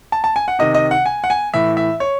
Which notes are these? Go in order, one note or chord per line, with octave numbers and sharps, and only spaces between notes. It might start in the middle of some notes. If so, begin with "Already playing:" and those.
A5
A5
G#5
F#5
C3 D#3 D#5
D#5
F#5
G#5
F#5
G#5
A2 E3 E5
E5
C#5